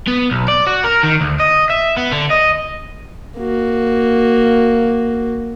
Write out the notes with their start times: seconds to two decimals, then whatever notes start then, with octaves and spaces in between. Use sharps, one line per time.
0.07 B3
0.31 B1
0.48 D5
0.67 F#4
0.84 A#4
1.04 D#3
1.21 D2
1.40 D#5
1.70 E5
1.97 B3
2.12 D3
2.30 D#5
3.38 A#3 F#4